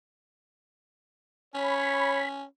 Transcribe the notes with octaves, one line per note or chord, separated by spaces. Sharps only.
C#4 C#5 B5